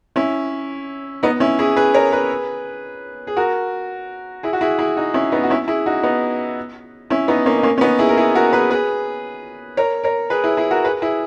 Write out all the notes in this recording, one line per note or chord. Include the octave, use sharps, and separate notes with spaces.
C#4 E4
B3 D#4
C#4 E4
E4 G#4
G#4 B4
A#4 C#5
G#4 B4
G#4
F#4 A#4
E4 G#4
F#4
E4 G#4
E4 G#4
D#4 F#4
C#4 E4
B3 D#4
F#4
C#4 E4
E4 G#4
D#4 F#4
B3 D#4
C#4 E4
B3 D#4
A#3 C#4
D#4
A#3 C#4
C#4
B3 D#4
E4 G#4
A#4
E4 G#4
F#4 A#4
G#4 B4
G#4 B4
A#4 C#5
A#4 C#5
G#4 B4
E4 G#4
E4 G#4
F#4 A#4
G#4 B4
E4 G#4